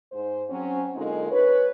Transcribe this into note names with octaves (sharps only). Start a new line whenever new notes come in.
G#2 C5
F#3 C4 C#4
D3 G#3 A#3 C4 D#4 F4
B4 C#5